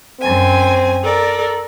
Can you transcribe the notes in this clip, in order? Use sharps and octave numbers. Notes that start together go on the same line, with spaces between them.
F#2 C4 G#5
A4 A#4 D5